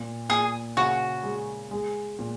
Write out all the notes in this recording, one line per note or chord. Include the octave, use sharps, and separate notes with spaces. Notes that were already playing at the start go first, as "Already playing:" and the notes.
Already playing: A#2
A#2 G#4
C#3 F#4
G#3
G#3
A#2